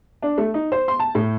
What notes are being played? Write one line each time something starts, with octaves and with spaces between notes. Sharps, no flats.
D4
A3
D#4
C5
C6
A5
A2